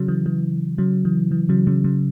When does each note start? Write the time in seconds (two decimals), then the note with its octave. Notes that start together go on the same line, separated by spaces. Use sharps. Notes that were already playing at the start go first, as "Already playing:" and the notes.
Already playing: C#3 F#3
0.08 E3
0.26 E3
0.78 C#3 F#3
1.05 E3
1.31 E3
1.49 C#3 F#3
1.67 C#3 F#3
1.84 C#3 F#3